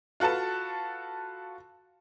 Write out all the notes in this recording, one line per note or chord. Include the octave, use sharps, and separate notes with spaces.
F4 F#4 A4 B4 A5